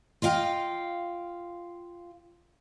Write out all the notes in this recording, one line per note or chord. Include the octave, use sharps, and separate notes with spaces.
F4 D#5 F5 G5